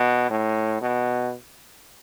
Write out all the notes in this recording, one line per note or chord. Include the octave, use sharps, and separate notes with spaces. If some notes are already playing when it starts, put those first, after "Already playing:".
Already playing: B2
A2
B2